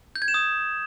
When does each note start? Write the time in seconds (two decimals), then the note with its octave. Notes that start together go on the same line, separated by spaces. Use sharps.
0.16 G6
0.22 G#6
0.28 E7
0.34 D#6